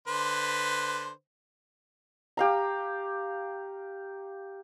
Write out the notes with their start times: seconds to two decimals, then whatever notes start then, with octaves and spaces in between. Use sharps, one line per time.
0.08 D3 B4 C5
2.37 G4 F5 A#5